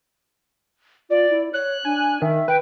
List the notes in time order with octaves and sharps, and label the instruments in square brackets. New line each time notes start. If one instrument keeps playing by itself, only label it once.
[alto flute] F4 [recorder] D5
[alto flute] E4
[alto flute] C#5 [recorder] F#6
[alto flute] D4 [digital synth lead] G#5
[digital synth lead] D#3 [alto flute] E5
[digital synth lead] B4 [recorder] G5